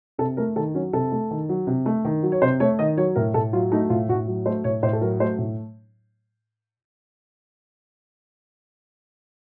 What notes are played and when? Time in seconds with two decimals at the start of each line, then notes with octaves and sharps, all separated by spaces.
0.18 C3 A4
0.37 A3 A#4
0.56 D#3 A4
0.75 F#3 C#4
0.93 C3 A4
1.12 A3
1.31 D#3
1.49 F#3
1.67 C3
1.86 A3
2.05 D#3
2.23 F#3
2.32 C#5
2.42 C3 C5
2.60 A3 C#5
2.79 D#3 D#5
2.97 F#3 C#5
3.15 A2 A#4
3.34 A2 A4
3.53 F#3 F4
3.72 A3 D#4
3.90 A2 F4
4.09 A2 F#4
4.28 F#3
4.46 A3 C5
4.64 A2 C#5
4.83 A2 C5
4.93 A4
5.01 F#3 A#4
5.20 A3 C5
5.38 A2